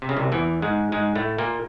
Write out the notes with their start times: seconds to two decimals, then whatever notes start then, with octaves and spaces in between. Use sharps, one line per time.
0.02 C3
0.09 C#3
0.17 C2 C3
0.32 E2 E3
0.62 G#2 G#3
0.92 G#2 G#3
1.15 A2 A3
1.38 A#2 A#3